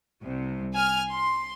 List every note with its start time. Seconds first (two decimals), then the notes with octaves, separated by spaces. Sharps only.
0.22 C2 C3
0.75 G#5 F6
1.11 C6